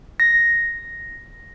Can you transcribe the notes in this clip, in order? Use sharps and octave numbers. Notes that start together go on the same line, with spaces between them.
A#6